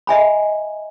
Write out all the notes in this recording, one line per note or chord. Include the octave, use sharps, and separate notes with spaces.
D#5 E5 G#5 B5